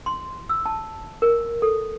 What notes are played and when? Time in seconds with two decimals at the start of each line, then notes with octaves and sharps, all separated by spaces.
0.06 C6
0.49 E6
0.66 A5
1.22 A#4
1.62 A4